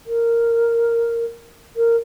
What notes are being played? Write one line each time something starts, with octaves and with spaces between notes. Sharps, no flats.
A#4
A#4